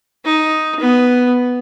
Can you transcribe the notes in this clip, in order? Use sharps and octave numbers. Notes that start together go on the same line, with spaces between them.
D#4
B3